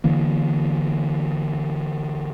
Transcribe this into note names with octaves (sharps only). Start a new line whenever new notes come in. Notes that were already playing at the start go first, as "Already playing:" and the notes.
D3 E3 A#3